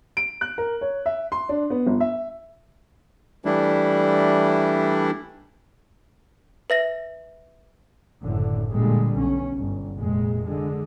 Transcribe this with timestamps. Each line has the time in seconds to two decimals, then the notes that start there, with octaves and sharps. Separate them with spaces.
0.17 D7
0.41 F#6
0.58 A#4
0.81 C#5
1.06 E5
1.32 C6
1.49 D4
1.70 B3
1.87 G1
2.00 E5
3.45 E3 G3 A3 D4 E4
6.70 B4 E5 A#6
8.23 F#1 A2 D3
8.69 A#2 D3 G3 G#3
9.16 B1 C#4
9.56 G1
9.98 F1 A#2 G#3
10.45 D3 G#3